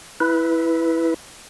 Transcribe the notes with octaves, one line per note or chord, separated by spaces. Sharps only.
E4 B4